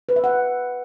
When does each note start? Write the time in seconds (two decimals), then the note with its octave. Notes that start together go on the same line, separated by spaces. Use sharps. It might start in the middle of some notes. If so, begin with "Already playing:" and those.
0.09 B4
0.16 E5
0.24 F#5